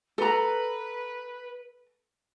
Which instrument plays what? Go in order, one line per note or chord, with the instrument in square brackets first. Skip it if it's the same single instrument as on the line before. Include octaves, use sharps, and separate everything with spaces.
[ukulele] A4 A#5 [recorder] B4